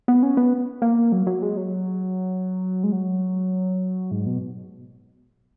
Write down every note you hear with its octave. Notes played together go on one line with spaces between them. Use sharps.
B3
C#4
B3
A#3
F#3
F#3
G#3
F#3
G#3
F#3
G#2
B2